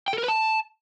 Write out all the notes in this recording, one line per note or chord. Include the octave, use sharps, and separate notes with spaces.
G5
A4
A#4
B4
A5